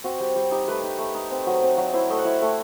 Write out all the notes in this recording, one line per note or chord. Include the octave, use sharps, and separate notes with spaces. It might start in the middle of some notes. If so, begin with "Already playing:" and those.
C4 F#4
G3
G3 G4
D#4 G4
A3 B4
D#4
A3
D#4
C4
F#3
C4
F#3
E4 C5
A3 D#5
F#5
E4 E5
A3 G5